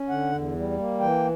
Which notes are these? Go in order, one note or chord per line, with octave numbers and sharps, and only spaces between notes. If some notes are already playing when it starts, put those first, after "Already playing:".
Already playing: C#4
D3 F#5
E2
G3
A#3
E3 G5